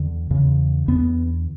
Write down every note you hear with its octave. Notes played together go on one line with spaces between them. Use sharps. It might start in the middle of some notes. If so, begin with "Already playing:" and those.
Already playing: E2 D3
E2 C#3
E2 D3 B3